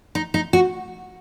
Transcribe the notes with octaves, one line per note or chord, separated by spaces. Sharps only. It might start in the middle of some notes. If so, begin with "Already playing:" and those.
D#4
D#4
F#4